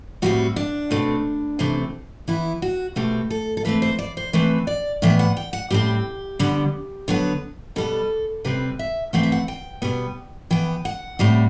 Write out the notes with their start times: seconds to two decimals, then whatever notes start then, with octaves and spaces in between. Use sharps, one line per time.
0.22 A2 G3 C4 F#4
0.56 D4
0.91 B2 A3 C4
1.59 C3 E3 A3 C4
2.28 E3 B3 E4
2.62 F#4
2.96 B2 A3 C4 G4
3.30 A4
3.57 A4
3.65 E3 A3 C4 B4
3.82 C5
3.99 D5
4.17 C5
4.33 E3 A3 C4 B4
4.67 D5
5.02 A2 E3 B3 E5
5.19 F#5
5.37 G5
5.53 F#5
5.70 A2 G3 C4 G4
6.39 D3 G3 B3
7.08 D3 F#3 B3
7.76 B2 G3 B3 A4
8.45 C3 G3 C4 B4
8.79 E5
9.13 E3 A3 C4 F#5
9.23 E5
9.32 F#5
9.48 G5
9.82 B2 G3 B3
10.51 E3 B3 G5
10.85 F#5
11.19 A2 G3 C4